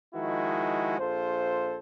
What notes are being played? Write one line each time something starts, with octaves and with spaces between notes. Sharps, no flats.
D#3 F3 G#3 E4 F#4
A#1 F4 A4 C5